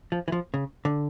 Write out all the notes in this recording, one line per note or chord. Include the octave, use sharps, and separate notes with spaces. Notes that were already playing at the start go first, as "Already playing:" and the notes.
F3
E3
F3
C#3
D3